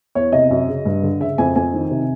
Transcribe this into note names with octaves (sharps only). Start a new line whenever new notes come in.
E2 C#5
C3 D#5
F#2
C#3
G2
D3
C#3 E5
F2 G#5
F2 G#5
D#3
C3